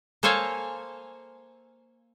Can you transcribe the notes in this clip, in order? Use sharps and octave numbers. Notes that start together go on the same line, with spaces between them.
A#3 A4 C5 C#5 F5 G#5